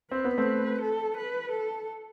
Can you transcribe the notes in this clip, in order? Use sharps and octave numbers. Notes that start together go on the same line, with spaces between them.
C4 B4
B3
A3 C4
A4
B4
A4